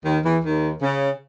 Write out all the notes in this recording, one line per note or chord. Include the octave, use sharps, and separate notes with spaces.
D#2 D#3
E2 E3
D#2 D#3
C#3